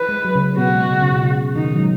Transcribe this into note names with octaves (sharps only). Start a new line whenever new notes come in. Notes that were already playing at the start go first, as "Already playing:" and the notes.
Already playing: B4
G#3
F#3
C#3
C#3
B2 B3 F#4
G#3
C#3
C#3
B2
C#3
D#3 D#4
F#3
G#3